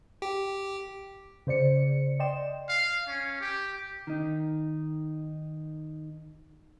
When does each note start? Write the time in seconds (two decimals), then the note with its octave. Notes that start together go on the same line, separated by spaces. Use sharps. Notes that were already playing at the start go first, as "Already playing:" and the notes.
0.22 G4
1.47 C#3 C5 D5 C#7
2.20 D5 D#5 G5 C6 E7
2.69 F5
3.08 C#4
3.41 G4
4.07 D#3 D#4